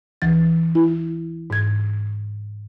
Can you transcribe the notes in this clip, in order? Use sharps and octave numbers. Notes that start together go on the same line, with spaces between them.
D2 E3 A6
E4
G#2 G#6